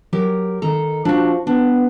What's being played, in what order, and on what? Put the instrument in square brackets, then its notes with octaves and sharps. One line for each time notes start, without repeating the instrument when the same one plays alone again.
[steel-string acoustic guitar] F#3 G4 A#4
D#3 A4 A#5
[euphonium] F3 [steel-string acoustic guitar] D4 F#4
[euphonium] B3 [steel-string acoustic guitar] D4